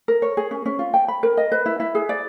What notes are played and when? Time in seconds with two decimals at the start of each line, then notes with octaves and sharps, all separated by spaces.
0.08 A#4
0.22 C#5
0.37 G#4
0.51 C#4
0.66 C#4
0.79 F4
0.94 G5
1.08 B5
1.23 A#4
1.37 D#5
1.52 B4
1.66 E4
1.80 E4
1.95 G#4
2.09 D5